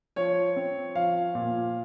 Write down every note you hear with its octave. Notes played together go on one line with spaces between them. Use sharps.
F3 C#5
C4
F3 F5
A#2